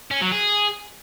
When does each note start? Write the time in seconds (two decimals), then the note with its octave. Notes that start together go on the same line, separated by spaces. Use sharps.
0.11 C#4
0.21 F#3
0.32 G#4